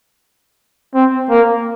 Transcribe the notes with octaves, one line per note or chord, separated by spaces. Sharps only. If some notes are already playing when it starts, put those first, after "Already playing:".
C4
A#3